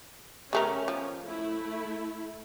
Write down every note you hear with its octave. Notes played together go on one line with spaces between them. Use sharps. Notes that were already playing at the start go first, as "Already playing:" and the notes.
C#3 A3 C#4 A#4
F3
A3 E4